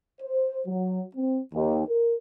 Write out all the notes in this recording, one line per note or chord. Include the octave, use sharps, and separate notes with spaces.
C5
F#3
C4
D#2
A#4